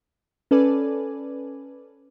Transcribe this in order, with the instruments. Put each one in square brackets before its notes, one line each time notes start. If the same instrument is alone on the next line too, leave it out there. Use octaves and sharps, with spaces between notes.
[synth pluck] C#4 A4 B4 D5 G#5